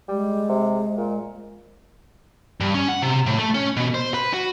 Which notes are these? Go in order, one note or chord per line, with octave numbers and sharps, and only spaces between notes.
G3 G#3
C3
A#2
G2
C#4
F#5
C3
A2
A3
C#4
B2
C5
B4
F#4